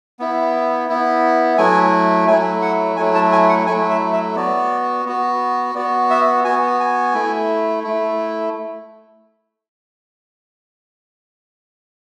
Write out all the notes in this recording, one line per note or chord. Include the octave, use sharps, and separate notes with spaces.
B3 E4
B3 E4
F#3 A3 E4 G#5
F#3 A3 E4 G#5
F#5
F#3 A3 E4 G#5
A5
G#5
F#5
F#3 A3 E4 G#5
E5
E5
B3 F#4 D5
B3 F#4
B3 F#4 D5
E5
B3 F#4 G#5
G#5
A3 E4
A3 E4